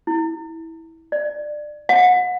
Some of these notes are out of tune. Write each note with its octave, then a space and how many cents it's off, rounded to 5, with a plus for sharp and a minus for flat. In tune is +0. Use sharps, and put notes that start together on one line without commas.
E4 -20
D5 +20
F#5 -30